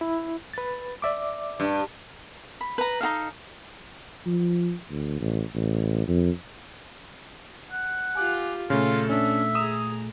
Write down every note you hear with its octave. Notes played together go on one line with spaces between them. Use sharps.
E4
B4 A6
D5 E5 D6
G2
B5
B4 A#5
D#4 F4 A4 F5
F3
D2
A1
A1
F2
F#5
F4 G4 G#5 D6 F#6
A#2 C#3 A3 C#4 F4 A4
C#4 D4 E5
G#4 A#5 D#6 E7